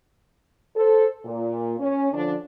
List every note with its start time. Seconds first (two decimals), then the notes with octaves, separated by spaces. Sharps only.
0.76 A4 C5
1.24 A#2
1.79 C#4
2.13 D3 F3 D4